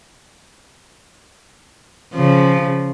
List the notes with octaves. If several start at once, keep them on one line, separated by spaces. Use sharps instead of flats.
C#3 F3